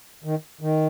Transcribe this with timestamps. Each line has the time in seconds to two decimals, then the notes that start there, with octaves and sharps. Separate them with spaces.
0.24 D#3
0.61 D#3